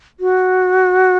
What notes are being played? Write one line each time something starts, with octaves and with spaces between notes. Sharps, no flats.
F#4